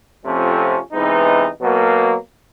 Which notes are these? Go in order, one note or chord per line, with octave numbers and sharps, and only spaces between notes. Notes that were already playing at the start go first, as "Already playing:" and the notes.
F2 C3 F3 A3 C#4
C3 E3 G#3 B3 D#4
B2 F#3 A#3